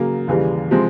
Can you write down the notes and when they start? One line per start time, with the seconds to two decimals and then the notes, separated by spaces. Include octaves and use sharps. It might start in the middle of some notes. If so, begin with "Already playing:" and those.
Already playing: C#3 F#3 A#3
0.28 D#2 C#3 E3 G3
0.71 C3 F3 G#3 C4